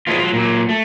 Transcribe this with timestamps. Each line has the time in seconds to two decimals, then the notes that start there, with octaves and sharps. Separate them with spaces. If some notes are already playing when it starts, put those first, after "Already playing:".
0.07 F3 F#3 G#3 B3 F4
0.19 F#3 F4
0.33 A#2 F#3
0.69 A3